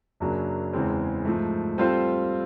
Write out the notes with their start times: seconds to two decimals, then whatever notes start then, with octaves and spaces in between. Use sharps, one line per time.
0.20 F#2 C#3 F#3 A#3 D4
0.73 E2 C#3 E3 G#3 C4
1.25 G#2 F3 A3
1.78 G3 C4 F4 A4 C5